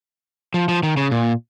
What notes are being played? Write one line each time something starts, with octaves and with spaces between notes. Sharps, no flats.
F3
F3
D#3
C#3
A#2